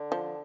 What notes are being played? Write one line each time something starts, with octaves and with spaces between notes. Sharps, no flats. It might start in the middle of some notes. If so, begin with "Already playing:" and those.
Already playing: D3
F3